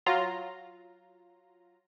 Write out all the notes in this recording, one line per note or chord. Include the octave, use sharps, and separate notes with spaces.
F#3 F4 A#5